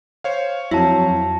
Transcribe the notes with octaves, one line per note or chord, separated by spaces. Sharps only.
C5 C#5 F5
F2 F#3 E4 A5 A#6